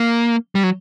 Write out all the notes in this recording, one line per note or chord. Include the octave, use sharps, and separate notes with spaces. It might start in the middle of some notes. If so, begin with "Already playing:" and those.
Already playing: A#3
G3
F#3